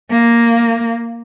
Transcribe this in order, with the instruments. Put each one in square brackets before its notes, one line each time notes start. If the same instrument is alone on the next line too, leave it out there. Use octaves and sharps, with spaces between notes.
[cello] A#3